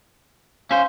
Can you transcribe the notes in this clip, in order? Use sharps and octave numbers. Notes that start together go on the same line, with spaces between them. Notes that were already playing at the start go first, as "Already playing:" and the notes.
C#4 C5 F5